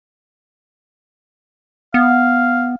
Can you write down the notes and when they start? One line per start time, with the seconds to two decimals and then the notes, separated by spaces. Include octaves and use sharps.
1.94 B3 F5